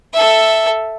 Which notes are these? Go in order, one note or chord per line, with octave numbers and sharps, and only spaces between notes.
A4 E5